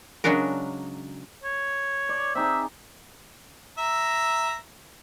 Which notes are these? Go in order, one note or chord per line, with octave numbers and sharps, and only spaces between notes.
C#3 F#3 G#3 D4 F#4 A#4
C#5
D5
C4 D#4 G#4 E5
E5 A#5